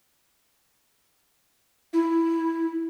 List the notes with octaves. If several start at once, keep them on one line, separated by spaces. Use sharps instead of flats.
E4